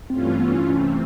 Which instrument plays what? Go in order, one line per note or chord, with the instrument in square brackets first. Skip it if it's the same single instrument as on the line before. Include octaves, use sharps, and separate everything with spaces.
[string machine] G2 E3 A3 C#4 F4 [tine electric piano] C4
[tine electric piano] B3
C#4
[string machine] C3 E3 A3 C4 [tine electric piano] C#4